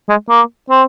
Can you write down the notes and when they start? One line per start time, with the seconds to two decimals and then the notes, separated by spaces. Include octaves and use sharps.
0.09 G#3
0.29 A#3
0.70 C4